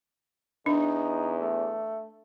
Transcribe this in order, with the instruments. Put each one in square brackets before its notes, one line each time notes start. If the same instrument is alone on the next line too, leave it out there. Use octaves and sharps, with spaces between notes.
[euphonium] E2 [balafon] D4 [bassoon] D#4
[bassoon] A3